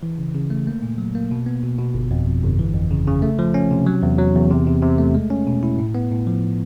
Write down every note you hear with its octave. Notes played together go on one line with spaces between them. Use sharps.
E3
C#3
C#3
A3
A#3
A#2
F#3
A#3
B2
B3
B2
B2
G1
F2
F2
G1
E3
F2
C#3
C#3
A3
F3
C#4
C3
F#3
E2
F#3
E2
C3
C3
C3
A3
G#3
C#4
B2
E4
A2
B3
A2
F3